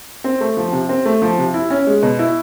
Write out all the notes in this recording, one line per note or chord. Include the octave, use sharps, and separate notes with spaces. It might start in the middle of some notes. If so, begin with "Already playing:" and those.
C4
A3
F3
C3
C4
A3
F3
C3
E4
C#4
G#3
B2
E4